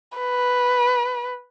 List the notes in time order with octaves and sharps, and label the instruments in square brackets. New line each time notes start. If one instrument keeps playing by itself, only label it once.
[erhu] B4